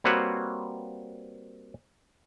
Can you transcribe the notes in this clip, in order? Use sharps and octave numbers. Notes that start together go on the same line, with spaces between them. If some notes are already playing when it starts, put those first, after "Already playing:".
G3 A#3 C4 F#4 B4 C#5